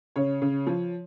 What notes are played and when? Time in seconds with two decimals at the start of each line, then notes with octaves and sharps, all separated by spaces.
0.16 C#3 C#5
0.42 C#3
0.67 F3